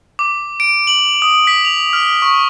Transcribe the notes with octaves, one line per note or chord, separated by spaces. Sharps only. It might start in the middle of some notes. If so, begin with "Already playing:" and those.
D6
D7
F#7
D#6
B6
F7
F6
C#6